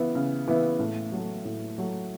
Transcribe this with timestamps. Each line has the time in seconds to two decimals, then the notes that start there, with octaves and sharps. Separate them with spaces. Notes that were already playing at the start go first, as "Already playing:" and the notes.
Already playing: C#3 E3 B3 E4
0.15 C#3
0.48 E3 B3 E4
0.79 A2
1.12 F#3
1.17 A3
1.45 A2
1.78 F#3 A3